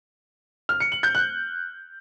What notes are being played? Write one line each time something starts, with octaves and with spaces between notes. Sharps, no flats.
F6
C#7
F#7
G6
F#6